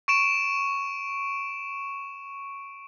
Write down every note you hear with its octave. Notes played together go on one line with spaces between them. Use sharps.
C#6 D7 E7